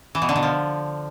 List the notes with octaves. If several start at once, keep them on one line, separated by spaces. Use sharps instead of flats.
E3
B2
D3
B2
F3